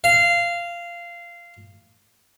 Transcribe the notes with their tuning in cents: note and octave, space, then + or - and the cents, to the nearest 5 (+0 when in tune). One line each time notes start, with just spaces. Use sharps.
F5 -15